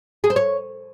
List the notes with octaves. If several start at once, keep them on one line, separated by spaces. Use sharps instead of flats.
G#4
C5
C#5